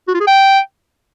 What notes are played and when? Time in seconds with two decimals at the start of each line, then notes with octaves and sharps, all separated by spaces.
0.08 F#4
0.14 F4
0.21 G#4
0.27 G5